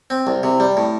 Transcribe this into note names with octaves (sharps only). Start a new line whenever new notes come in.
C4
C2
C3
G3
A2